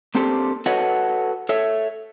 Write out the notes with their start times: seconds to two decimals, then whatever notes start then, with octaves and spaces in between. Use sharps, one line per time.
0.15 A#3 C4 D4 G4 A4 C5
0.66 F#4 A4 B4 C#5 D#5 F#5
1.49 A4 C#5 E5